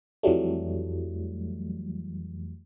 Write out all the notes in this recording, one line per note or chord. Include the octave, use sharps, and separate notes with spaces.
F2 E3 F#3 G3 A3